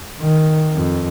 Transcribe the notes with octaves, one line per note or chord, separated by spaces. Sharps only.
D#3
F2